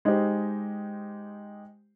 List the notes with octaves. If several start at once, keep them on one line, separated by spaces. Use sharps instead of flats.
G#3 D#4 G4 C5